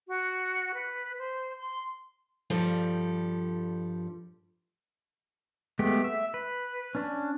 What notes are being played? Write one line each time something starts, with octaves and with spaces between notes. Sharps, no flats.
F#4
B4
C5
C6
G2 F3 G3 A4
G#3 A3 B3 G4
E5
B4
C#4 D4